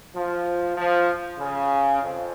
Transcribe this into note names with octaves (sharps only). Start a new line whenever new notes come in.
F3
F3
C#3
F2